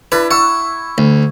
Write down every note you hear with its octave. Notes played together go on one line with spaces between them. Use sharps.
D4 E4 B4
F#5 C#6 E6
D2